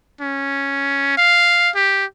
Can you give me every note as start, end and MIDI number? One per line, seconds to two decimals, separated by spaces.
0.21 1.13 61
1.17 1.70 77
1.75 2.05 67